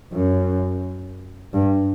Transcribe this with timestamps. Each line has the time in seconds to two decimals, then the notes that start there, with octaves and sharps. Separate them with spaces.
0.13 F#2
1.54 G2